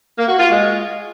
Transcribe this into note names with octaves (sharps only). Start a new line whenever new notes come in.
A#3
F#4
F4
G#3